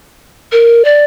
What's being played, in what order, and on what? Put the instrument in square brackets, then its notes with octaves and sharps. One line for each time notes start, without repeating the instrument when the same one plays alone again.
[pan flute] A#4
D5